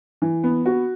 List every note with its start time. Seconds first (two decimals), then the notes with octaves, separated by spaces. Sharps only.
0.22 E3
0.43 B3
0.66 F#4